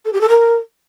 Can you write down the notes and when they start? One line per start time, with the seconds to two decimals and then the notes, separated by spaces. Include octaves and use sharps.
0.05 A4
0.12 G4
0.20 A4
0.28 A#4